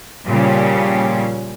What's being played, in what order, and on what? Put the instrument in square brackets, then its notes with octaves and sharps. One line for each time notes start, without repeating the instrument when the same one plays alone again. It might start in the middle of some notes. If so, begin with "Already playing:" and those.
[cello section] A#2 C#3 F3 G3 C#4 G4